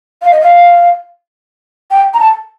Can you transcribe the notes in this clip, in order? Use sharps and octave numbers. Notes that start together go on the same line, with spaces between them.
F5
D#5
F5
G5
A#5
A5